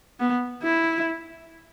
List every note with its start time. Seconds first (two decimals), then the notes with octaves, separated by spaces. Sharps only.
0.20 B3
0.63 E4